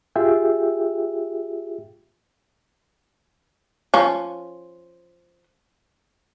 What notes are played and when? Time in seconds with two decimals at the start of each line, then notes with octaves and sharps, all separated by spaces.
0.16 F4 G4 G#4 E5 G5
3.94 F3 C#4